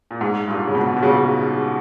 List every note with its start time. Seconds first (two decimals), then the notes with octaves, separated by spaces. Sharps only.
0.11 A#2
0.21 G#2
0.48 G2 A#2
0.67 C#3
0.75 G#2 B2
0.97 B2
1.02 A#2 C#3